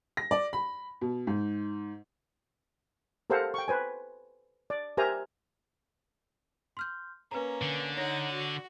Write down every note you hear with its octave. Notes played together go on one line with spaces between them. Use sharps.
A#6
D5
B5
B2
G#2
G4 A4 A#4 C5 F5 F#5
G5 C#6
B4 C5 G#5
D5
G4 A#4 C5 E5 G#5 A#5
C6 F6 G6
A#3 C#4 B4 A#5
D3
D#4 C#5 F#5 A#6
F#4